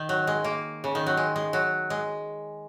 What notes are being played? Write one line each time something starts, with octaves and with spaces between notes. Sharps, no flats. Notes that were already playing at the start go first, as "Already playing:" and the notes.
Already playing: D#3
F#3
G#3
A#3
C#3
D#3
F#3
G#3
G#3
F#3
G#3